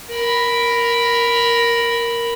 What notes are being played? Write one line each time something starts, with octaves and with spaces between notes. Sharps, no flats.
A#4 B5